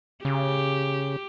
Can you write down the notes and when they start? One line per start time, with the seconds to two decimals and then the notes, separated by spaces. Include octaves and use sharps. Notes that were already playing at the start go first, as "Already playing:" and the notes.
0.25 C#3 G4